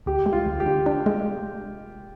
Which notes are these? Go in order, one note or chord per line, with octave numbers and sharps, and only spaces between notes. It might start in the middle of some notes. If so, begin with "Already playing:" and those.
D2 G4
G#3
F4
D2
G4
D3
D4
G#3